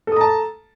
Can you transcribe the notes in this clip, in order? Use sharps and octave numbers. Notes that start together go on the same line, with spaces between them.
A4 A5 A#5 D#6